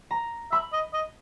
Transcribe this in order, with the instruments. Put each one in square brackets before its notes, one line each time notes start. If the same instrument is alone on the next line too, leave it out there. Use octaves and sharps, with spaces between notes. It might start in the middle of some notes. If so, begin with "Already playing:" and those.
[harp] A#5
[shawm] E5 [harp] B5
[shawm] D#5
D#5